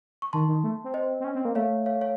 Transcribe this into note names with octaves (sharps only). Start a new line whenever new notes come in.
C#6
D#3 A5 C6
D#3
A3
C4
C5 D#5
C4
C#4
C4
A#3
A3 C#5 F5
C#5 F5
C#5 F5